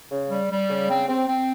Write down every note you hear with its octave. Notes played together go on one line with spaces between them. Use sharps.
C#3
G3
G3
C#3
C4
C4
C4